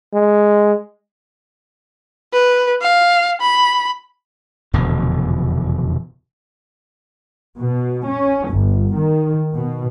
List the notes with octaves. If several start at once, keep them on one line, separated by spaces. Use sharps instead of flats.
G#3
B4
F5
B5
F1 E2 B2 D3
B2
C#4
G1
D#3
B2